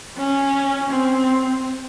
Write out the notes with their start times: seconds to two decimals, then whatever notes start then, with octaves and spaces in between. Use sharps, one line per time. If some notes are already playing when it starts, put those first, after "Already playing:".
0.17 C#4
0.89 C4